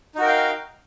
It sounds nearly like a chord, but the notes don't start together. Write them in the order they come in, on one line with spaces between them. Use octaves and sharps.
D#4 F#4 A#4 G5 F5